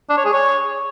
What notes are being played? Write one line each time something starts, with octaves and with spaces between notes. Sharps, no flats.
D4
C#5
G#4
C#5